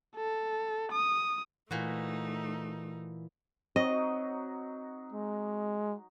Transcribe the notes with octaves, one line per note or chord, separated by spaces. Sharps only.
A4
D#6
A#2 E3 A3 D#4 F#4
F#3 C4 D#4 F#4 D#5
G#3